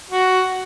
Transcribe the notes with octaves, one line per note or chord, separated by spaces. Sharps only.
F#4